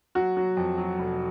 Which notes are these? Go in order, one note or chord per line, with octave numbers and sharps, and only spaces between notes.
F#3 F#4
F#3
F2
F#3
F1